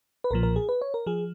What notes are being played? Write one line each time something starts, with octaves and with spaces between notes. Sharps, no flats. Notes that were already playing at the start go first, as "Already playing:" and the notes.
B4
B1 A#2 F3 A#4
A#4
G#4
B4
C#5
A#4
F3 G#4